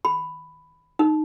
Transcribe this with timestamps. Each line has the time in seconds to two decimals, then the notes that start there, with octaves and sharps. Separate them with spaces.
0.05 B5
0.99 D#4